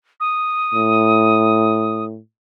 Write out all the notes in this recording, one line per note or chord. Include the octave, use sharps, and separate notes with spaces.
D#6
A2